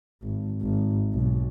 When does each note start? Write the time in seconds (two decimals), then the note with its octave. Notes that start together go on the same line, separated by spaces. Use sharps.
0.23 G#1
0.62 G#1
1.13 B1